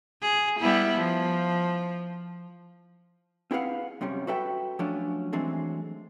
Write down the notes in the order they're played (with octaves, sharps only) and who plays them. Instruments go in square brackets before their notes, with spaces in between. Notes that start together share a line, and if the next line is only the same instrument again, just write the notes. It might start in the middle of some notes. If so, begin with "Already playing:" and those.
[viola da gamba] G#4
G3 B3 E4
F3
[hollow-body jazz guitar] C4 E4 G#4 B4 F5 F#5
F#2 C3 G3 C#4
F#4 A4 B4 E5 G5
F3 F#3 A3 C#4 D4
E3 F#3 G#3 A3 C4 D4